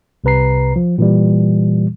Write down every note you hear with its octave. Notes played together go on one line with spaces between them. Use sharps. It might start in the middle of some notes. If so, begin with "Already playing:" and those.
C2 C3 B4 A#5 C7
F3
A#2 E3 G3